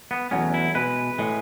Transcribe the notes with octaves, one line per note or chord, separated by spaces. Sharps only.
B3
E2 B2 F#3 A3 C#4
E4
B2 G#3 B4
A2 G#3